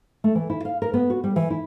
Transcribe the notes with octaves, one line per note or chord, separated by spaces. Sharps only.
A3
E3
E4
F5
A#4
B3
F#4
G3
E3
E4